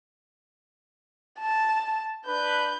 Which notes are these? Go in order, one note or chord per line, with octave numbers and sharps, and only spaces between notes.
A5
D4 B4 G6